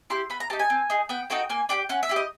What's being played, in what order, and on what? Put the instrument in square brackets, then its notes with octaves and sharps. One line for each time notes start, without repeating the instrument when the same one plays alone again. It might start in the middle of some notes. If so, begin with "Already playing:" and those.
[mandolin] E4 G4 C6
B3 B5
A#5
G4 A5
D#4
G#5
C4
D#4 G#4
B3 G5
D#4 F#4 A4 G5
A#3 G#5
D4 G4 G5
C#4 F#5
E5
E4 G4
D#5